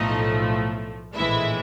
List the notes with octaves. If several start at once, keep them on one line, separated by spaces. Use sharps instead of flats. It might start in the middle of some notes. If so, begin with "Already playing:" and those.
Already playing: B1 A2 F3 A3 D#4 D#5
A#1 A2 E3 G#3 E4 E5